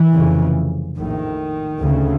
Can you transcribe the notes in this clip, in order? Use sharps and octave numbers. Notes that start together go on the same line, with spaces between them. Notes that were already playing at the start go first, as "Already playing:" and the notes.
Already playing: E3
F1 F2 C#3
A#1 A2 D#3
D2 C#3